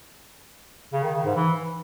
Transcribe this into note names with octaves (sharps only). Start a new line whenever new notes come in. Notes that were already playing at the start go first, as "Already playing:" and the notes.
C#3
D#3
C#3
G#2
E3